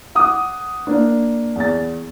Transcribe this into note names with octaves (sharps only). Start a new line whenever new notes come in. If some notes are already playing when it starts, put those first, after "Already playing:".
F#5 D6 D#6
A#3 D4
E2 A6